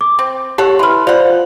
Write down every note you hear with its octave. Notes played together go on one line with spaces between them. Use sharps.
D6
C4
G4 A4 C#5 F#5
E3 B4 C6 F6
F4 C5 D5 F5 F#5